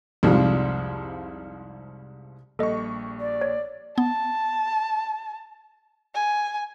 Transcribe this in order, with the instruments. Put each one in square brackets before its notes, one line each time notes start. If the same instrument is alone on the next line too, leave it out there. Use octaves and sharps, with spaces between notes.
[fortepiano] C2 F2 G#2 F3 G3
[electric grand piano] A#1 G3 C#6 [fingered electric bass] A#3 [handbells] A4 D#5
[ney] D5
[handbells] C#5
[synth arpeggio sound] B3 [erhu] A5
[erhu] G#5